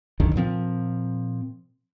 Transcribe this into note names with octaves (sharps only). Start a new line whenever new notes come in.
C2 F#2 D3 D#3
A#2 F3 C4